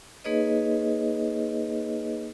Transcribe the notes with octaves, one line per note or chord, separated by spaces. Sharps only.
A#3 D#4 G#4 B4 C#5 D#5